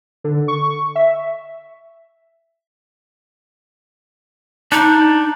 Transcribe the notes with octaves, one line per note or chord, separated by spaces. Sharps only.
D3
C#6
E5
D4 D#4